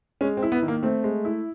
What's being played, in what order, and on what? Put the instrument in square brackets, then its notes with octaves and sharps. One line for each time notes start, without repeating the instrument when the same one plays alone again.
[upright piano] G#3 [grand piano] C#4
[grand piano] C4
[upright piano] E4
[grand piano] B3
[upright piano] D#3
[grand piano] A#3
[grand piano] A3 [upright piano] C4
[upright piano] G#3
E4